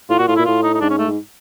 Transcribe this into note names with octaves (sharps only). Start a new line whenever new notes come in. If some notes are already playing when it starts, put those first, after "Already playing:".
A2 F4
A#2 F#4
A2 F4
A#2 E4
A2 F4
D#4
D#4
G#2 D4
C#4
A3
G#2